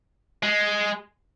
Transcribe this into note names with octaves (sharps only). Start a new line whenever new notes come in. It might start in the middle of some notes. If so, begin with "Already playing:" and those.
G#3